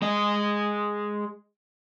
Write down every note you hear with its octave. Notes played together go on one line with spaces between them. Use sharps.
G#3 D#5